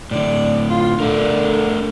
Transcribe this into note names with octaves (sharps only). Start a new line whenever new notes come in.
A2 D3 D5
F4
D3 A3 D4 A#4